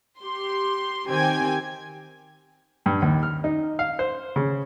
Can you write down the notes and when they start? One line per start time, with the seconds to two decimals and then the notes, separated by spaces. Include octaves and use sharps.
0.21 G4 C6
1.08 D#3 C4 G4 G5 G#5 G#6
2.86 G2
3.02 D#2
3.23 F6
3.44 D#4
3.79 F5
3.99 C5
4.36 C#3